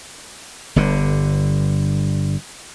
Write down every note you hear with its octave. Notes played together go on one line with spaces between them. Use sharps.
G1 G2 D3